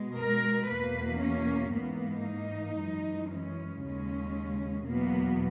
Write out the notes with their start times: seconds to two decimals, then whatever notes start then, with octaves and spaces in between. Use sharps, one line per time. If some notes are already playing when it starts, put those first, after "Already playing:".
Already playing: B2 G#3
0.18 A#4
0.70 E2 B2 A#3 B4
1.22 C#4
1.75 G#2 E3 A#3 B3
2.27 D#4
2.79 F#2 E3 G#3
3.31 C#4
3.83 D#2 C#3 G#3 C#4
4.88 E2 B2 F#3 A#3 B3